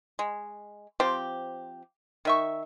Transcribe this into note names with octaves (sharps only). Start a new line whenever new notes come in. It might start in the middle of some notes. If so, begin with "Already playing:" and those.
G#3
F3 C4 G4
D#3 E5 C#6